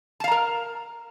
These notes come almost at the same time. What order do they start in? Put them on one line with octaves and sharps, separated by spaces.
A5 F5 A#5 A#4